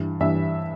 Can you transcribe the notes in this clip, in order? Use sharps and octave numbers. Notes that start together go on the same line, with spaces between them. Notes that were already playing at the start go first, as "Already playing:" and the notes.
Already playing: G2 E3
G2 E3 E5